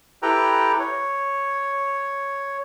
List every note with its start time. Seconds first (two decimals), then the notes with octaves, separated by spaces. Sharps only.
0.22 E4 G4 A4 B4 G5 A#5
0.80 C#5